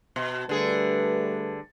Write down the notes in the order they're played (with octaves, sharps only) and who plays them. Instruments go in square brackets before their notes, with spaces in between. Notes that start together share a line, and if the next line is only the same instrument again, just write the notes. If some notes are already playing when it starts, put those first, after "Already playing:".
[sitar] B2
[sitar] D3 G#4 [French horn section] G3 A3 B4